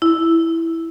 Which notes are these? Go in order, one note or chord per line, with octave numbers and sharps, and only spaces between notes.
E4